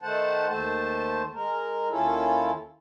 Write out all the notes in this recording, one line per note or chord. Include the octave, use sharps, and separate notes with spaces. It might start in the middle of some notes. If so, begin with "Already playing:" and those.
D#3 A3 C5 F#5 A5
D#2 A3 C5 A5
G#3 A#4
D#2 C#4 E4 F4 A4